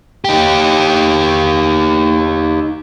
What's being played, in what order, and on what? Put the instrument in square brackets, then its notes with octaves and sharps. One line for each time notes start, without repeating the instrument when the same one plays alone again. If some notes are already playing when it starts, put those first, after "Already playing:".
[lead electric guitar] D#4 G4